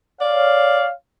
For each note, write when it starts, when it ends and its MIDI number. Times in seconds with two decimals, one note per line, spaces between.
0.21 0.90 73
0.21 0.86 74
0.21 0.90 77